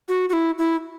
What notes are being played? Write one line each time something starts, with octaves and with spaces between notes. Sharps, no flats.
F#4
F#4
E4
E4